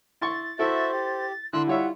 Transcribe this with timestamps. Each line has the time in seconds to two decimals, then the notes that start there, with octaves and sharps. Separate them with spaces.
0.21 E4 C6 C#6 A6
0.59 E4 F#4 A4 C5 E5
0.92 G4
1.53 D3 E4 C6 E6 F#6
1.67 G3 F4 C#5 E5 F#5